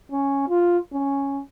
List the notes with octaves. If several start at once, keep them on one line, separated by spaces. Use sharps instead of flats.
C#4
F4
C#4